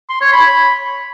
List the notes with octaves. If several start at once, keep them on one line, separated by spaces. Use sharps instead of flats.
C6
C#5
B5